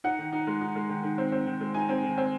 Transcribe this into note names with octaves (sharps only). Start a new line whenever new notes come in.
D#4 F#5
D#3
D#4
G#3
D#4
G#3
D#3
D#3
C4
C4
D#3
G#3
D#4 G#5
C4
D#3
C4